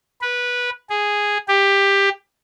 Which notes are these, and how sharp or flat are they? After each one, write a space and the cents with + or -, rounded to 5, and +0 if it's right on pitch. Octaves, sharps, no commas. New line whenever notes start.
B4 -15
G#4 -5
G4 +15